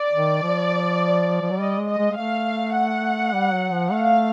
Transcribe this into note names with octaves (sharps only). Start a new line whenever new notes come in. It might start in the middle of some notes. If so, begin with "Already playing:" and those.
Already playing: D5
D#3
F3
F3
F#3
G3 D#5
G#3
D#5
G#3
G#3
A3 F5
F#5
G3
F#3
F3
A3 F5